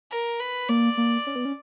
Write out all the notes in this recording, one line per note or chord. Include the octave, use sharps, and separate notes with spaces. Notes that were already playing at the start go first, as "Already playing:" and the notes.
A#4
B4
A#3 D5
A#3
C#4
B3
C#4